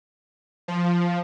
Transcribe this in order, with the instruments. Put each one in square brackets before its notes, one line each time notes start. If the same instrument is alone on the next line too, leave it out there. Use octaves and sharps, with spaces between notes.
[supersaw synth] F3